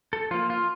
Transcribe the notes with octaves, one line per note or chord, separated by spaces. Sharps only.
A4
F3 A#3 F4
F4